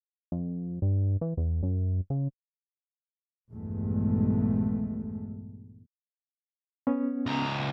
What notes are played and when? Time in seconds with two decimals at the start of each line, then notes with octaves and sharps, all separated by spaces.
0.32 F2
0.82 G2
1.21 E3
1.37 E2
1.63 F#2
2.10 C#3
3.53 A#1 E2 G2 G#3 A3
6.87 B3 C#4
7.26 C#2 A#5